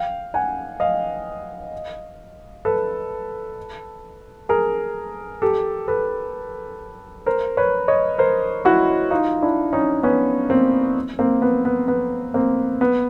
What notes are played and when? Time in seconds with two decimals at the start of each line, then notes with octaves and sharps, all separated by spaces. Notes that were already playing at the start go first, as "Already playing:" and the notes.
Already playing: F5 G5
0.34 F#5 G#5
0.80 D#5 F5
2.65 A4 B4
4.49 G#4 A#4
5.42 G4 A4
5.88 A4 B4
7.26 A#4 C5
7.57 B4 C#5
7.88 C#5 D#5
8.18 A#4 C5
8.65 E4 F#4
9.11 D#4 F4
9.42 D4 E4
9.73 C#4 D#4
10.03 B3 C#4
10.50 A#3 C4
11.19 A#3 C4
11.42 B3
11.65 B3
11.88 B3
12.34 A#3 C4
12.81 B3